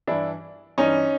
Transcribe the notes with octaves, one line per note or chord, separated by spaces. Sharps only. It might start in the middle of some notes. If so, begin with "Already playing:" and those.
G2 E3 D4 E4
G2 E3 C#4 D#4